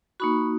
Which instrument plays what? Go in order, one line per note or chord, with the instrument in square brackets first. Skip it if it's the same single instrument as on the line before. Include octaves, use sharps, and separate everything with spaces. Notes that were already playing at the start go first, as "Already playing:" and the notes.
[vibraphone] A#3 D#4 F#4 B5 C#6